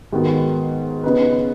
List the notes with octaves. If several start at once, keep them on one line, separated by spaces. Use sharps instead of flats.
G#2 D#3 B3 F#4
C#3 B3 D#4 B4